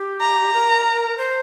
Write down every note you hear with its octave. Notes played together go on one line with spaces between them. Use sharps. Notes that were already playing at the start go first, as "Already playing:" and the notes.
Already playing: G4
A#5
A#4
C5